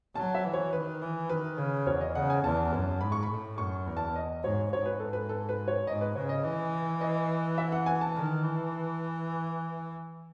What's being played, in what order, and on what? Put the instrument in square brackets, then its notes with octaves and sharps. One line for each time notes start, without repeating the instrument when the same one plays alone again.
[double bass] F#3 [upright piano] A5
[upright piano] E5
[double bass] E3
[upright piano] C#5
[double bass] D#3 [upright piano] B4
[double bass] E3
[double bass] D#3 [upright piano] B4
[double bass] C#3
[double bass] E2 [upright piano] C#5
[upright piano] D#5
[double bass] C#3 [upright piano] F#5
[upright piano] G#5
[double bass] E2 [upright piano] A5
[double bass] F#2
[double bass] G#2 [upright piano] B5
[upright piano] C#6
B5
[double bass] A2
[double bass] F#2 [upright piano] C#6
[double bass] E2
[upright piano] A5
D#5
[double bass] G#2 [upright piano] C#5
[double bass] G#2 [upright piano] C#5
[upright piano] B4
A4
B4
A4
B4
C#5
[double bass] G#2 [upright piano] D#5
[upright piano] B4
[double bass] C#3 [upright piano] C#5
[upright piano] D#5
[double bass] E3
[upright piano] D#5
E5
F#5
G#5
A5
[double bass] D#3
E3